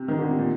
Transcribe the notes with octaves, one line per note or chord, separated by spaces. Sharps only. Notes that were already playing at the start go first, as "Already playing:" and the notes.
Already playing: C3
D#3
D3
C3
A#2